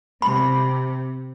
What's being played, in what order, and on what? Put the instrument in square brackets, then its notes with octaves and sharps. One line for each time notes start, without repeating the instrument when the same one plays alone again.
[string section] C3 [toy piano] B5